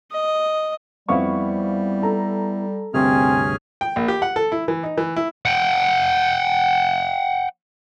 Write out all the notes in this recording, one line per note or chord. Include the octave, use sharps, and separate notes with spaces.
D#5
F2 G3 B3 E4 F5 C#6
A4 A#5
D2 G2 C3 C4 C#4 G#4 F6
G5
A#1
G4
F#5
A4
E4
E3
D#4
E3
E4
F#5 G5